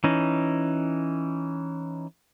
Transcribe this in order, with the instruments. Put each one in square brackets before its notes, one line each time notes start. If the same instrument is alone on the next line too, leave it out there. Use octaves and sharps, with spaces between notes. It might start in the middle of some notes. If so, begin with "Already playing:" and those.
[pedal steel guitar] E3 C#4 D#4